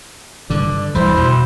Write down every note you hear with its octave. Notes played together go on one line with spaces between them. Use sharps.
G2 D3 D5
E2 G3 E4 C5
B2